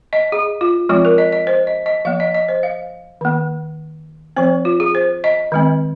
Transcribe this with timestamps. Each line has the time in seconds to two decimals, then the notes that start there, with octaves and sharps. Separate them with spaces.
0.13 D#5
0.32 G#4
0.61 F4
0.89 F3 G#3 C4 F4
1.05 A#4
1.18 D#5
1.33 D#5
1.47 C5
1.67 D#5
1.86 D#5
2.05 F3 A#3 F5
2.20 D#5
2.34 D#5
2.48 C5
2.63 F5
3.21 D#3 A#3
4.36 F3 C4 C5
4.65 F4
4.80 G#4
4.95 C5
5.24 D#5
5.52 D#3 G#3 C4